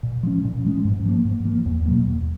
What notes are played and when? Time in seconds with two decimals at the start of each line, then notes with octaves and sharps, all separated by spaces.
0.03 A#2
0.23 F3 G#3 C#4
0.45 A#2
0.65 F3 G#3 C#4
0.85 G#2
1.05 F3 A#3
1.25 G#2
1.45 F3 A#3
1.66 E2
1.86 B2 F#3 A#3
2.07 E2